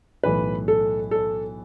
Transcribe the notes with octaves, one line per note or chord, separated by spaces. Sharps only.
B1 A2 E3 A3 B4
A4
A4